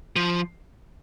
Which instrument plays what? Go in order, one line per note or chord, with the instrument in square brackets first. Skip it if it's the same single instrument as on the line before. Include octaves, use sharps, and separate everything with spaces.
[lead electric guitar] F3